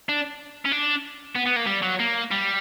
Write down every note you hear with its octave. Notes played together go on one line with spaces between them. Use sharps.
D4
C#4
D4
B3
B3
A#3
G3
F#3
A#3
G3